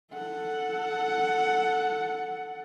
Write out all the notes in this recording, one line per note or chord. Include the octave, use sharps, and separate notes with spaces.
A4 F#5